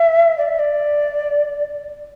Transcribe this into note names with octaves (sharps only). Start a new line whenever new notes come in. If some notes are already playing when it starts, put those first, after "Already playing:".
Already playing: E5
D5
E5
D5